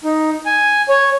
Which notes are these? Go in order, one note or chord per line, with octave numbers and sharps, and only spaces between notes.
D#4
G#5
C#5